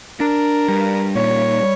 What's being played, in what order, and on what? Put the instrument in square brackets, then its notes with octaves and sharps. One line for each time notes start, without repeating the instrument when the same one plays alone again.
[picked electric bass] D4 [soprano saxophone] A#4
[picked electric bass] G3
[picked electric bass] A#2 [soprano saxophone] C#5